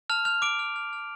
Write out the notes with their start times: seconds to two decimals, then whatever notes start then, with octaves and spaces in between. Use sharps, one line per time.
0.10 A5 F6 F7
0.25 F6 G6 F7
0.42 D6 F6 D7
0.59 F6
0.76 F6
0.93 F6